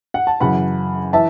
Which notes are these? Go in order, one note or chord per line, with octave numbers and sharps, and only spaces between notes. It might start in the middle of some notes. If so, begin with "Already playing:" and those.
F#5
A5
F#2 C#3 E3 F#5 B5
E3 E5 A5